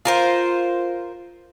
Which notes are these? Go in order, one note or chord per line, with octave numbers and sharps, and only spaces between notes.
F4 A#4 C5